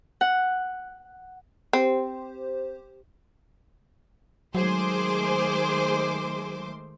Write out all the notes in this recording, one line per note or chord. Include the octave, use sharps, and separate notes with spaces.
F#5
C4 G4 C5
D#3 F#3 G#3 A3 G#4 C5 C6 D6